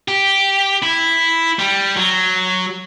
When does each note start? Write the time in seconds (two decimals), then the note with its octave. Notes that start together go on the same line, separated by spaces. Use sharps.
0.08 G4
0.83 E4
1.59 G3
1.97 F#3